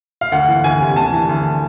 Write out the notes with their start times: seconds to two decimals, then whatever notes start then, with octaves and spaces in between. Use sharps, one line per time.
0.21 F5
0.32 D2 F#5
0.48 E3
0.64 D2 G#5
0.80 C3
0.96 D2 A5
1.12 E3
1.29 D2